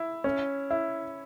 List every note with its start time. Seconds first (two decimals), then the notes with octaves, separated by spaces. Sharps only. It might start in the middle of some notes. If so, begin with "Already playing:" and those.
Already playing: E4
0.24 C#4
0.71 E4